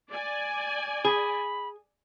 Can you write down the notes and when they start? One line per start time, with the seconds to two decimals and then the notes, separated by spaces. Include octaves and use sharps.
0.11 D5 G#5
1.05 G#4 B5